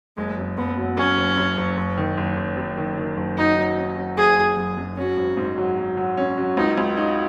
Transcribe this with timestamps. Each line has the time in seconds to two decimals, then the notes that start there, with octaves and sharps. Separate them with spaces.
0.17 F#1 G#3
0.38 F#2
0.57 F#1 B3
0.77 F#3
0.97 F#2 C#4
1.18 F#1
1.37 F#2
1.57 F#1
1.77 F#1
1.97 D#3
2.17 F#1
2.37 F#1
2.57 F#2
2.77 D#3
2.98 D#3
3.17 F#1
3.38 F#3 D#4
3.57 F#3
3.77 C#4
3.97 F#3
4.17 F#1 G#4
4.37 F#1
4.57 F#2
4.78 F#2
4.97 C#4 F#4
5.17 G#1
5.37 G#2
5.58 F#3
5.77 F#3
5.97 F#3
6.17 C#4
6.37 F#3
6.57 C#2 D#4
6.77 C#2
6.97 D#4 F#4